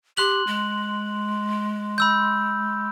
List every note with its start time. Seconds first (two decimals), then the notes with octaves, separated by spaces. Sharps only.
0.17 G4 C6 F#6 F#7
0.47 G#3
1.98 B5 E6 G6